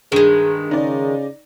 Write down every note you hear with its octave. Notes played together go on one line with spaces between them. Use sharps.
G2 D#3 G#3 G#4
C#3 D#4 D5